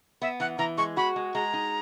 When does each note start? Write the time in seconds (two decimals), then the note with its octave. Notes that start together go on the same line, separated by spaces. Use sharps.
0.22 B3 E5
0.40 E3 F#5
0.59 E3 A#5
0.78 G#3 C#6
0.97 F#4 B5
1.16 G#3
1.35 G#3 A#5
1.54 D#4